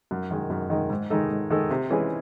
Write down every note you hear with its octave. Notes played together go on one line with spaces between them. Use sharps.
F#2
D#3 G#3
F#2
D#3 G#3
G#2
D#3 G#3 D#4 A4
G#2
D#3 G#3 D#4 A4
C3
E3 G#3 C#4 G#4